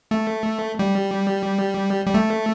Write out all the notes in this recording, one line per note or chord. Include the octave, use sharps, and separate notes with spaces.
A3
G3
G3
A3